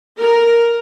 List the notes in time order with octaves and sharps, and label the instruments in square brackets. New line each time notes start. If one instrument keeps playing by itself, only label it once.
[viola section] A#4